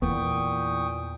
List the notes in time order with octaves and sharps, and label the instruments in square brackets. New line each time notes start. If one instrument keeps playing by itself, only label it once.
[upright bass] E2 [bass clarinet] A#2 [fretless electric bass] E3 A#3 B3 [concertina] G5 C#6 D#6